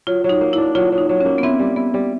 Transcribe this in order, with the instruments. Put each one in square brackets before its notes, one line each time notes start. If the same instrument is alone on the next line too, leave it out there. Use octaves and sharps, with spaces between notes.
[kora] F#3 [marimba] F4
[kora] F#3
[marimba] D#4
[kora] A#3
[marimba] E4
[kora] D4
[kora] F#3 [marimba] F4
[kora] F#3
[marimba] D#4
[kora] F#3
[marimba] C#4
[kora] A#3
[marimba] B3
[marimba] C4 [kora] E4
[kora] G3
[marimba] B3 [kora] E4
[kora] G3